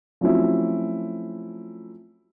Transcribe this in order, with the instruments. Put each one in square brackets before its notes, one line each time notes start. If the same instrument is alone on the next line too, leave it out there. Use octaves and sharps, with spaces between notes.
[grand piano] F3 F#3 A3 C4 C#4 E4